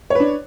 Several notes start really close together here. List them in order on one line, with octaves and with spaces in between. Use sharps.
C#5 B4 D4